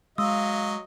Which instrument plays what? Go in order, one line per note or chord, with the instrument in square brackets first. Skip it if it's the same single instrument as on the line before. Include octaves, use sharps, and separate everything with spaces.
[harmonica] F#3 D#5 [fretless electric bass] G#3 [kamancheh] F5 [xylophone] C6 D#6 E6